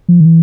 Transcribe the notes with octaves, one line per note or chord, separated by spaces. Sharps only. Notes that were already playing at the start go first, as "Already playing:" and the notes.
F3
D#3
E3